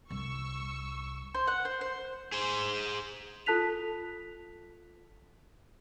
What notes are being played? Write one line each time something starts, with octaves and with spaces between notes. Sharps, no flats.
C2 C#6 E6
C5
F#5
C5
C5
G#4 C5
F4 A4 A5 F#6 B6 F7